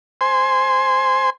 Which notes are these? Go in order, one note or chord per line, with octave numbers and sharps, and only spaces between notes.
C5 G#5 C6